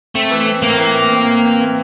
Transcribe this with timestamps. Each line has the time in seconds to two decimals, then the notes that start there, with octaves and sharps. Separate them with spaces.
0.15 A3 C4
0.31 E3
0.47 C4
0.62 A2 A#3
0.78 E3
0.95 A2
1.12 C4
1.27 E3
1.44 C4
1.60 E3